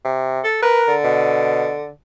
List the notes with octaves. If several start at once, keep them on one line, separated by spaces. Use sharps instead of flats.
C3
A4
A#4 B4
D3
B2